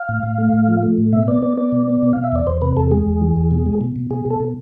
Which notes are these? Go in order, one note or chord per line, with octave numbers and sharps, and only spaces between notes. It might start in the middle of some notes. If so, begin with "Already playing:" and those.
Already playing: F5
A2
A2
A3
A2
F3
A3
A2
B2 E5
B3 D5
B3 D5
B3 D5
B2
B3
B2
B2 F5
E5
E2 D5
E2 C5
C3 B4
E2 A4
G#3 G#4
E2
E3
E2
B2
G#3
B2
B2
B2 G#4
B2 A4
B2